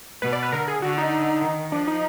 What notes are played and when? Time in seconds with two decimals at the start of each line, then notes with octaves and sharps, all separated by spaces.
0.22 B2 B4
0.33 D5
0.43 B4
0.52 D3 A#4
0.68 G#4
0.82 D3 F#4
0.98 D#4
1.42 D#3
1.72 F3 D4
1.88 D#4